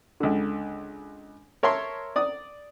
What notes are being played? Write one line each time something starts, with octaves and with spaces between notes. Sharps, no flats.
C#2 D3
A#4 C#5 E5 A5 C6
D5 D#6